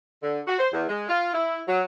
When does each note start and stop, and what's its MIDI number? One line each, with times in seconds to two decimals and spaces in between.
0.23 0.40 50
0.47 0.58 66
0.59 0.68 72
0.73 0.87 40
0.88 1.05 56
1.09 1.33 65
1.34 1.60 64
1.68 1.82 54